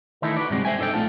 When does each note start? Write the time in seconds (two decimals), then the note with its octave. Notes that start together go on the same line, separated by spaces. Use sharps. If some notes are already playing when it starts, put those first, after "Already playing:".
0.22 D#3 E3 A3 D#4 E4 A4
0.36 F#4 B4 D5
0.50 G2 C3 G#3 C4
0.65 C5 E5 G5 G#5
0.79 D4 D#4 A4 D5 G5
0.94 B1 F#2 A3 F4 A4